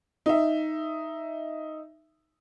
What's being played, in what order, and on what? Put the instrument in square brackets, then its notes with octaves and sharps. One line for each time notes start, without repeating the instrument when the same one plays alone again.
[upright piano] D#4 E5